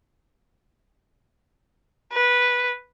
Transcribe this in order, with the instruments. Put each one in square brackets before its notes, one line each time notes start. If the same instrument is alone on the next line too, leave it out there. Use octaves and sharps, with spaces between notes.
[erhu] B4